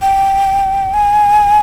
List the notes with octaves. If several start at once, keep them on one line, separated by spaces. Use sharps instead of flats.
G5
G#5